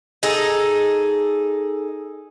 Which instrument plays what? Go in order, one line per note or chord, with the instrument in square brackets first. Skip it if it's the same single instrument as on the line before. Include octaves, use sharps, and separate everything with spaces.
[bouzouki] D#4 G#4 A4